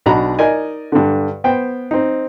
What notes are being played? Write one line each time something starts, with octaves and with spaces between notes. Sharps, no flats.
B1 D4 F#4 A#5 B5
D#4 A#4 D5 D#5 G#5
G2 D3
B3 C5 G5
C4 D#4